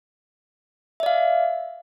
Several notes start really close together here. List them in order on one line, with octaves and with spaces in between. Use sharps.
E5 D5 F5